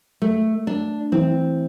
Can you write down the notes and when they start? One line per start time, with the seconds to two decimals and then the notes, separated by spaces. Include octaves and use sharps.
0.22 A3
0.67 D4
1.12 E3 C4